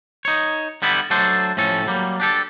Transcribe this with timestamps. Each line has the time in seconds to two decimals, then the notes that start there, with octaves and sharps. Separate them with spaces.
0.25 D#4 C#5
0.82 D3 G3 B3 E4
1.10 F#3 A3 D4 A4 C5
1.57 A2 F3 C#4 A4
1.86 F#3 G3 A#3
2.20 D4 G4 A4